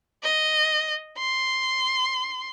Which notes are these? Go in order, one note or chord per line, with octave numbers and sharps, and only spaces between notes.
D#5
C6